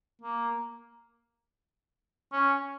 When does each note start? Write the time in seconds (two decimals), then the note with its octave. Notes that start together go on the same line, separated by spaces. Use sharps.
0.21 A#3
2.32 C#4